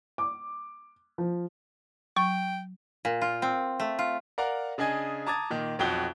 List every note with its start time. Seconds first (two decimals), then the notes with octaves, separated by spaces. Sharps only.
0.18 D6
1.18 F3
2.16 F#3 G5 C#6
3.05 A#2
3.21 F4
3.42 C4
3.80 A3
3.99 F4
4.38 A#4 D5 F5 F#5 A#5
4.78 C#3 D4 G#4 D#5 G#5 G#6
5.27 A5 A#5 D6 D#6 G#6 A6
5.50 A#2 D#3
5.79 B1 F2 F#4 G5 G7